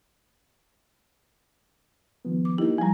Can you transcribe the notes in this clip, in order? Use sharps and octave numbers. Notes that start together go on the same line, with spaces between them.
D#3 F3 B3
D6
A#3 D#4 E4 G4
F3 G3 G#5 A#5